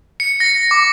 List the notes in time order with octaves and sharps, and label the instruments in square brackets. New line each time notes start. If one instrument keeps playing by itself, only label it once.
[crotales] C#7
A#6
D6